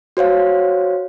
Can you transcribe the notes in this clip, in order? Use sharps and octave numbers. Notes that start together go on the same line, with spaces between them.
F#4 C5 C#5 F5